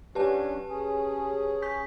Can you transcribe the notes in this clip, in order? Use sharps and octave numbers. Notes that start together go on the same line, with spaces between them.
F#3 C#4 D4 G4 B4 A5
C#4 G#4
C#6 G6 B6